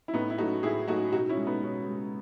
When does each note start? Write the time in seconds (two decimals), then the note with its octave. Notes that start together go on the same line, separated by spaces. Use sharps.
0.08 E4
0.13 A2 B3 D#4
0.30 E4
0.38 F#3 A3 D#4 F#4
0.63 A2 E4 G#4
0.88 F#3 A3 D#4 F#4
1.12 B2 D#4 F#4
1.29 C#4 E4
1.37 G#3
1.47 B3 D#4
1.63 B2 C#4
1.88 G#3